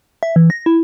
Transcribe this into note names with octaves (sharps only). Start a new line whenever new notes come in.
E5
E3
A#6
E4